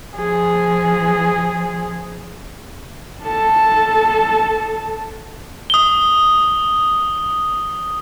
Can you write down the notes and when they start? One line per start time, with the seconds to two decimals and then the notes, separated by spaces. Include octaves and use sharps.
0.17 F3 G#4
3.23 A4 A5
5.70 D#6 G7